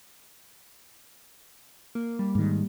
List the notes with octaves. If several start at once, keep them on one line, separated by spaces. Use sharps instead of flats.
A#3
G3
G#2 D#3